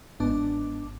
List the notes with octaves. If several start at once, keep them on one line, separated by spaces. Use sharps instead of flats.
G1 G#2 B3 D4 A5 D6